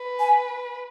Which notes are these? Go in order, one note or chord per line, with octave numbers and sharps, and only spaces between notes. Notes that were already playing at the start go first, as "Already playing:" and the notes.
Already playing: B4
G#5